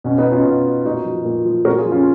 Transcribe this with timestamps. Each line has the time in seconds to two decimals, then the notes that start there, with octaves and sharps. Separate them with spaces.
0.04 B2 C#4
0.18 B3 D#4
0.31 C#4 F4
0.45 B2
0.85 A#2 D#4 F#4
1.05 F3
1.25 A#2
1.45 F3
1.65 A#2 F#4 A#4
1.78 F4 G#4
1.85 F3
1.92 C#4 F4